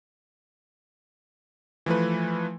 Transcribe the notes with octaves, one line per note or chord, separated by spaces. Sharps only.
E3 F3 A3 B4